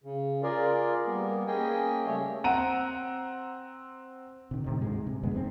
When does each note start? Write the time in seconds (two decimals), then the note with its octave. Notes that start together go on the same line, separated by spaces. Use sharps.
0.04 C#3
0.43 F4 G#4 A#4 D5
1.07 G3 A#3 B3
1.47 A#3 C#4 G#4 D#5 G5 G#5
2.07 C#3 G3 A3 C#5 E5
2.44 C4 F#5 A#5 D#7
4.51 C3 D#3
4.64 A2 C3 D#3
4.80 D2 G#2 G3 G#3
5.07 C3
5.23 F#2 D3 G#3 B3
5.34 F1 G#2 C4